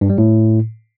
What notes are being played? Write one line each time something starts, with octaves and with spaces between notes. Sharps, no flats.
G2
G3
A2